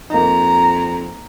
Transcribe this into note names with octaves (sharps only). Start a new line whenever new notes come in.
F2 A#3 D#4 A#5